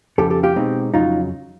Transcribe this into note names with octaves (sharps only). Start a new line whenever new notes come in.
F2 C#3 F3 G4 A4
G4 A4
F4 G4
B2 G#3 C4 D#4
F2 C#3 F#3 D#4 F4